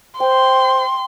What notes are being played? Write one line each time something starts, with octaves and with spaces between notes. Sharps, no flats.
C5 G5 C6